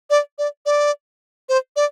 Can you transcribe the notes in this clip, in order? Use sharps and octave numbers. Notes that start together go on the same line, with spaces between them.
D5
D5
D5
C5
D5